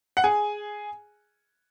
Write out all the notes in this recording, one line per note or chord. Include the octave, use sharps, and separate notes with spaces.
F#5
G#4 G#5